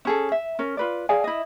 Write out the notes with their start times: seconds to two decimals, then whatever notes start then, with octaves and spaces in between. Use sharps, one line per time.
0.05 C#4 G#4 A4
0.32 E5
0.59 C#4 A#4
0.77 F4 B4 D5
1.09 G#4 D5 F5 G#5
1.24 E4 D#5